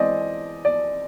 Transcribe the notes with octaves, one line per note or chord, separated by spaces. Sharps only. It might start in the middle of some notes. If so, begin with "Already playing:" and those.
Already playing: E3 G#3 C4 D5 D#5
D5